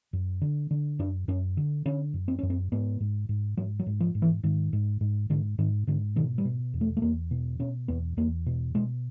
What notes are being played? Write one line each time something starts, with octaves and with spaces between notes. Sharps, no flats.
F#2
D3
D3
F#2 D4
F#2 C#4
D3
D3 C#4
F#2
C4
F#2 C#4
C4
G#2 B3
G#2
G#2
G#2 F#3
F#3
G#2
F3
G#2
E3
G#2 D#3
G#2
G#2
G#2 D3
G#2 D#3
G#2 D3
B2 D#3
G3
B2
E2
A3
A3
E2 A#3
B2
B2 C#4
E2 B3
E2 A#3
B2
B2 G#3